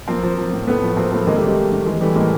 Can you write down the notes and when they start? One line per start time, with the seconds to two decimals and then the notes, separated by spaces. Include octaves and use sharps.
0.08 F3 A#3 C4
0.23 F3
0.38 F3
0.53 A2
0.67 A2 A3 B3
0.83 F3
0.97 F3 A#3 C4
1.12 F3 A3 B3
1.27 D#3 G#3 A#3
1.36 G3 A3
1.42 C3 G#3
1.57 C3
1.72 D#3
1.86 E3 G#3
2.01 E3 G3 A3
2.16 A2 G#3 A#3